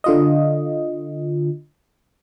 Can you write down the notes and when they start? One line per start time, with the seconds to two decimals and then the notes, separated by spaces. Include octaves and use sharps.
0.04 D3 F4 D#5